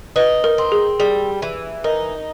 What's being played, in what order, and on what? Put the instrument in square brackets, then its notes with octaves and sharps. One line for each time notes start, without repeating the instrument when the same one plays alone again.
[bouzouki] D#4 [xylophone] B4
[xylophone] A#4
[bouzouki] C4
[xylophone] G#4
[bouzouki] G3 [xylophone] G#4
[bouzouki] E3
[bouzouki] D#4 [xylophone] A#4